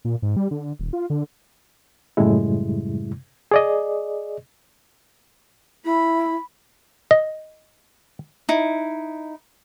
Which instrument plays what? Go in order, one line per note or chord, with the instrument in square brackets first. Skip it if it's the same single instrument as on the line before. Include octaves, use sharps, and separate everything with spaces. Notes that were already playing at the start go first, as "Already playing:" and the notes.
[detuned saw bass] A#2
G#2
G3
D3
D#1
F4
D3
[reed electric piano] F#2 A2 C#3 G3 G#3 E4
G#4 D5 D#5
[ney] E4 [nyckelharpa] B5
[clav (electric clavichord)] D#5
[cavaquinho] D#4 E4